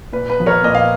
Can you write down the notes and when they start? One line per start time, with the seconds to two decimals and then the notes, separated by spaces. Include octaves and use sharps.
0.13 A#2 B4
0.30 B4
0.38 F3 B3
0.46 A#4 C#5
0.64 A#2 D#5
0.75 F5